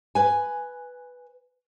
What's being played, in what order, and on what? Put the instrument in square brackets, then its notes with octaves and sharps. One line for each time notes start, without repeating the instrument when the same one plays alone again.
[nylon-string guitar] B4 G#5